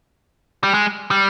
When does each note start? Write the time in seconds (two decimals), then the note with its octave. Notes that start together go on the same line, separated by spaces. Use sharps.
0.64 G3
0.74 G#3
1.11 G3